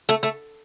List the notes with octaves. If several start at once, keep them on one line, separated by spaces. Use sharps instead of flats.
A3
A3